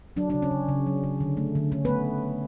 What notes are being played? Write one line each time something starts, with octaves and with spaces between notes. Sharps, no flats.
F#3 D4
D4
C#3
C#4
C#3
C#3
F#3
C#3
D3
A3
D3
D3 C#4
B3 B4
A3